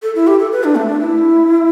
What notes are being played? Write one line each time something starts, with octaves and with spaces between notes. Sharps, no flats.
A4
E4
G4
A4
B4
D4
A3
D4
E4